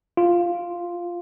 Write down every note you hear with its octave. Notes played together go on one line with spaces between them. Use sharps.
F4